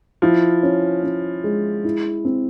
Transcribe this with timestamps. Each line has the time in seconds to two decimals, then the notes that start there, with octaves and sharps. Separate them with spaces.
0.22 F3 E4
0.63 C#4
1.03 C#4
1.44 G#3
1.84 E4
2.25 C4